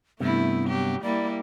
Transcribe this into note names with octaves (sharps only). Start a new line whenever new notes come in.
G2 C3 A3 B3 E4
F#3 G4
G3 A#3 E4 D5